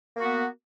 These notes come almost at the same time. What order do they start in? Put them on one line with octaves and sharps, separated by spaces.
A#3 F#4 B3